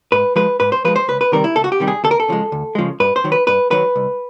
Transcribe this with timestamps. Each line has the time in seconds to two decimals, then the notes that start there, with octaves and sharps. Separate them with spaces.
0.12 G#2 B4
0.36 F3 G#3 B4
0.60 G#2 B4
0.72 C5
0.85 F3 G#3 B4
0.96 C5
1.08 C#2 B4
1.21 B4
1.32 C3 D#3 G3 A#4
1.44 E4
1.56 C#2 A4
1.64 F#4
1.72 G4
1.80 C3 D#3 G3
1.88 G#4
2.04 D2 A4
2.11 A#4
2.20 A4
2.28 C#3 F3 G#3
2.52 D2
2.75 C#3 F3 G#3
3.00 G2 B4
3.16 C5
3.24 D#3 F#3
3.32 B4
3.47 G2 B4
3.71 D#3 F#3 B4
3.96 C2